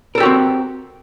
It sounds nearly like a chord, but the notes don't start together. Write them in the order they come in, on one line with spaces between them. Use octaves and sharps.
A#4 A4 G4 F#4 C4